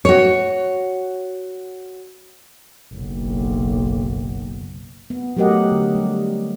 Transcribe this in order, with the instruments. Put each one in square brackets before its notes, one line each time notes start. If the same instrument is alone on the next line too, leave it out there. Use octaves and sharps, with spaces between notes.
[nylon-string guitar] F#4 C#5
[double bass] F#1 B1
[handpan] B3
F#3 A3 G4 A#4 D#5 F#5
D3
G3